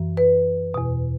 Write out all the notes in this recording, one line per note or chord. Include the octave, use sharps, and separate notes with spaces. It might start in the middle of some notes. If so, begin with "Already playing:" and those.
Already playing: F#2 E3
B4
E2 B2